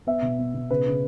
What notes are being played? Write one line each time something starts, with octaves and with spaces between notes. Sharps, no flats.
B3 E5
B2
B3
B2
C#3 B4
C#3